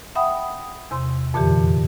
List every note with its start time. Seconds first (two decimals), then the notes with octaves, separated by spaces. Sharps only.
0.16 E5 F#5 G5 B5 D#6
0.91 E2 C3 C6
1.34 F2 A#2 D3 E3 G4